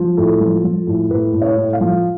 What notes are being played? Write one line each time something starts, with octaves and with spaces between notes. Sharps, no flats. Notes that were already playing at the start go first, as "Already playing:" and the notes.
Already playing: F3
A2 A4
F3
F3
A2
A2 B4
A2
C#5
A2
F5
F3